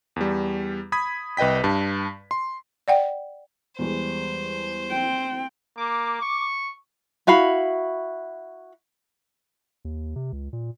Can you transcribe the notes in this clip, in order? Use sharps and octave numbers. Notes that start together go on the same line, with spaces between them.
E2 G3
B5 D#6 G#6 B6
C2 B4 D#5 G5 B6
G2 A5
C6
D5 F#5 G5
E2 G3 G#3 C5
C4 G5
A#3 D6
C#6
E4 F#4 F5 B5
D#2
C3
C#2
A#2